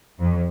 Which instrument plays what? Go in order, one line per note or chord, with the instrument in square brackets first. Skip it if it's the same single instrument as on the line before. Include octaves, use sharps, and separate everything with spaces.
[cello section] F2